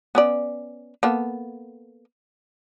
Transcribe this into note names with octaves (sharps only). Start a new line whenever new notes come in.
B3 C#4 D5
A#3 B3 A4